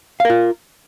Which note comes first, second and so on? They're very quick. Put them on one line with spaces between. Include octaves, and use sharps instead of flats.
F5 A#4 F4